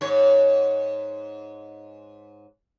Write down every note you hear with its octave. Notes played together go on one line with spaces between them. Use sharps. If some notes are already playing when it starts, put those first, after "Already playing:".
G#2 C#5